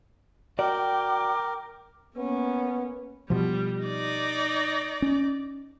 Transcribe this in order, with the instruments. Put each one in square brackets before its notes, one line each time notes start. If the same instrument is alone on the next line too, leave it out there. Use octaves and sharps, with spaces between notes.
[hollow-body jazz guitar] F#4 D5 [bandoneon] A#4 [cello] G5 [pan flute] D6
[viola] A#3 C#4 [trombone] B3
[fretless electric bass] B2 F3 [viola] G3
[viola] D#4 D5
[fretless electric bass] C#4